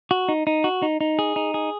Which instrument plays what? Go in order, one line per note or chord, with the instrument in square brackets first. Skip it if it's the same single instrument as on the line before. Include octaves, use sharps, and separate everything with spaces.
[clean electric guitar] F#4
D#4
D#4
F#4
D#4
D#4
G#4
D#4
G#4